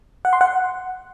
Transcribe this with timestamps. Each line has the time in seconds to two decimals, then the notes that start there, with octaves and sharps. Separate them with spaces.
0.25 F#5
0.33 C6
0.41 F#5